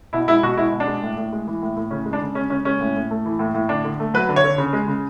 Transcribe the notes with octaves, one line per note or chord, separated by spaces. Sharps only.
B2 E4
G#3 E4
B2 F#4
G#3 E4
B2
D4
G#3
A2
A2
G#3
E3
A2
A2
C#3 C#4
G#3
D4
C#3
G#3 C#4
C#3 C#4
G#3 C#4
A2
A2
A3
E3
A2
A2
D3 D4
D3
A3
F#3 B4
D3
C#5
D3
C#3
G#3
C#3